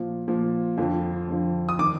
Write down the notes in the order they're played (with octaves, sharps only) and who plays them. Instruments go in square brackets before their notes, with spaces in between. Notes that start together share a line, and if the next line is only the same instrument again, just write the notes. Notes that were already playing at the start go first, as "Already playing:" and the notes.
Already playing: [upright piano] A#2 F3
A#2 F3
F2 D3 F3
F2 D3 F3
D#6
D#3 D6